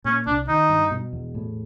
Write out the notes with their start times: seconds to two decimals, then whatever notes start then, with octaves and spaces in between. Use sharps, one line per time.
0.05 A#2 C#4
0.27 C2 D4
0.48 D#3 D#4
0.69 G2
0.91 B2
1.13 E2
1.35 A2